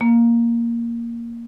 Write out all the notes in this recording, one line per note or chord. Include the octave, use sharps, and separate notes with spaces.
A#3